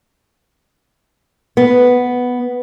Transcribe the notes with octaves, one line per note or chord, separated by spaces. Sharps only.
B3